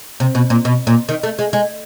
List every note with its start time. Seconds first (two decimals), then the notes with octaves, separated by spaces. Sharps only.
0.20 C3
0.35 B2
0.50 A#2
0.65 B2
0.87 A#2
1.09 D#3
1.23 A3
1.39 G#3
1.53 G#3